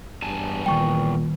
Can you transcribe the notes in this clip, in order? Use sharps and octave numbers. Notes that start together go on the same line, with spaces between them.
E2 G2 G#5 A5
A#2 D#3 G3 G5 C#6